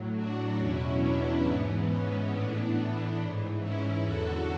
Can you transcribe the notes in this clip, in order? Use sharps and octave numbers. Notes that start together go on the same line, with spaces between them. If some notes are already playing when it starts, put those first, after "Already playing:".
Already playing: A2 F#3
D4 F#4
E2 B2 F#3 C#4 E4
B3 D4
G#2 E3 B3
C#4
A2 E3 B3 D4
G#2 E3
C#4 E4
E2 D3 F#3 F#4 A4